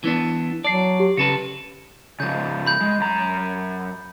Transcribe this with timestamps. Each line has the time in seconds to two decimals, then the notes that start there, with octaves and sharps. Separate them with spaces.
0.04 E3 B3 D4
0.64 F#3 D5 A5 C7
1.00 G4
1.17 C#3 A4 B4 C#7
2.20 C#3 F3 G6 A6
2.66 B5 G6
2.81 G#3
3.00 F#2 A#5